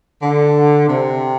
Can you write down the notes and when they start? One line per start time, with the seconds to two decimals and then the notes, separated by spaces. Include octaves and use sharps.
0.21 D3
0.87 C3